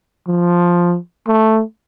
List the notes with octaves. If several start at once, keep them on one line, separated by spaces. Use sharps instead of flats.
F3
A3